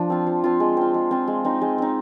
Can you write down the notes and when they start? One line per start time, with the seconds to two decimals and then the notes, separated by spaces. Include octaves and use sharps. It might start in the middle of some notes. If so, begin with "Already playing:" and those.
Already playing: F3 D4
0.10 C4 F4
0.27 F3
0.44 C4 F4
0.60 G#3
0.77 C4 F4
0.94 G#3
1.11 C4 F4
1.28 G#3
1.45 C4 D#4
1.62 G#3
1.78 C4 D#4